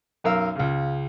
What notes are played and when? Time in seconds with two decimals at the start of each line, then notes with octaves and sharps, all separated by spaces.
0.24 B1 F#2 A#4 F5 E6
0.55 C#2 C#3